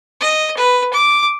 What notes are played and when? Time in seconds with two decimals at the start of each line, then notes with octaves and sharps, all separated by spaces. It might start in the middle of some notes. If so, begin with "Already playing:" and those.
0.21 D#5
0.57 B4
0.93 D6